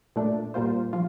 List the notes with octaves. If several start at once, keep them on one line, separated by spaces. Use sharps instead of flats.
A#2 A3 D4
A#2 G3 A#3 F4 C5
F3 F4